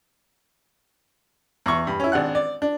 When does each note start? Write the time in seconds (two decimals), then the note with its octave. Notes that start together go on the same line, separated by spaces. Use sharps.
1.66 E2 C#6
1.87 G2
2.00 C#4 E4
2.12 G#1 D4 F#5 F#6
2.35 D5
2.62 D4